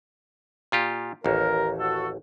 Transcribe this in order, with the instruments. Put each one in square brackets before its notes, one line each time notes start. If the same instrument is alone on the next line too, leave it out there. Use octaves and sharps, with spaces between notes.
[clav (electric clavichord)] A#2 F4 G4
[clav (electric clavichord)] A1 D#2 [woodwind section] A#4
[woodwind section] F#4 A4